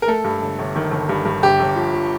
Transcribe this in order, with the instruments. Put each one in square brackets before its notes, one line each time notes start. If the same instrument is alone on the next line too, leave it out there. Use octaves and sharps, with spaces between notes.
[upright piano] A#4
A3 A4
G2
G1
G1
D#3
G1
G2
G2
G1 G4
G1
F3
F3